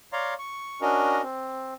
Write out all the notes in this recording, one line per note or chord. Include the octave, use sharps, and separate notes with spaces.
C#5 D5 F5 A#5 C6
C#6
C#4 D4 F#4 A#4 D#5
C4